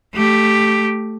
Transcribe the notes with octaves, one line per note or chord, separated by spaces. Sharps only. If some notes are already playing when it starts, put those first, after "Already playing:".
A3 G4